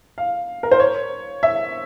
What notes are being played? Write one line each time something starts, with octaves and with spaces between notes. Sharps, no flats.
F5
A#4
C5
C#5
E5